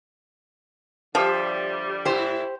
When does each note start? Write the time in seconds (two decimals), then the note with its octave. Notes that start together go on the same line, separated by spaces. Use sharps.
1.15 D3 F3 G3 G4 C5 E5
2.05 A2 E4 G4 C5